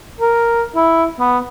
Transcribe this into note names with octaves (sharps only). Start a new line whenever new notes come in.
A#4
E4
B3